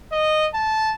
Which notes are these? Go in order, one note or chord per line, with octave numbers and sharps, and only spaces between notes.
D#5
A5